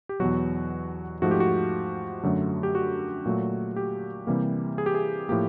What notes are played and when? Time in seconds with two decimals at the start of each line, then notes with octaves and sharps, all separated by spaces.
0.09 G4
0.20 E2 B2 F#3 F#4
1.22 G#2 F3 A3 F#4
1.31 G4
1.40 F#4
2.23 F#2 D3 F#3 A3
2.63 G4
2.75 F#4
3.25 A#2 F#3 A3
3.76 G4
4.27 C3 E3 G3 A#3
4.78 G#4
4.86 G4
4.95 G#4
5.29 A2 F3 A#3 G4